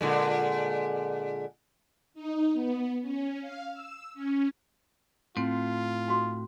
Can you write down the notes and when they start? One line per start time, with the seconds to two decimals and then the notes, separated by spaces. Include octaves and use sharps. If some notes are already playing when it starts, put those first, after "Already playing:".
0.01 A#2 D3 G#3
2.14 D#4
2.52 B3
3.01 C#4
3.41 F5
3.72 E6
4.14 C#4
5.37 A2 C4 F4
6.08 D#4 F#4 C6